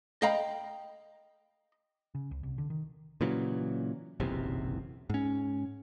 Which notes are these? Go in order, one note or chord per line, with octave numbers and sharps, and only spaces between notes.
D#5 F5 G5 A#5 B5
C#3
C#2
C2
D3
D#3
A#2 C#3 E3 F#3
F#1 B1 E2 C3
G#2 C#4